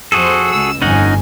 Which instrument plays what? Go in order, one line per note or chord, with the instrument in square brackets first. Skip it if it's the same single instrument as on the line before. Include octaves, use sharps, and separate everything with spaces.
[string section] F2 C5 [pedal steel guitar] F#4 G#4 A4
[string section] C#2 E6
[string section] G1 F2 G#5 [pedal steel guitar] C#4 D#4 F#5